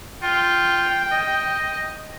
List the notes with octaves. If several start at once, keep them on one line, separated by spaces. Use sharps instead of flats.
F4 G5
D#5